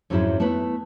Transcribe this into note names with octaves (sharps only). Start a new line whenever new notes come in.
F2 G#2 F#3 C#4 D4 E4
A3 B3 E4 B4